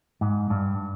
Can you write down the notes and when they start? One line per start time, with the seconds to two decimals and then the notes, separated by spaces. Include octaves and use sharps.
0.21 G#2
0.50 G2